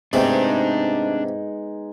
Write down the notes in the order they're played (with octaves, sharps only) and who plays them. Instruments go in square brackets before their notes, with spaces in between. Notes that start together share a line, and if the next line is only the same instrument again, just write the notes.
[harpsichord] G#2 C3 A3 [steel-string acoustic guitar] G#3 B3 D#4 [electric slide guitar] D4 G5